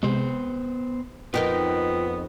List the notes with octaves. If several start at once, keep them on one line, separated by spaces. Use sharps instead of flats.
C3 G#3 B3 C5
F2 B3 D#4 F4 A#4 G5